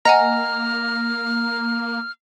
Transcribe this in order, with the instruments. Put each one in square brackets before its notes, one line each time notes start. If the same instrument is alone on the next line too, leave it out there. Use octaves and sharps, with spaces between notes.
[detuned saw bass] A#3 [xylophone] D#5 F#5 G#5 [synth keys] A#5 [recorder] F6